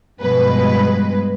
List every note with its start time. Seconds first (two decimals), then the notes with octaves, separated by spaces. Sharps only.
0.21 G2 B2 F3 G#3 B4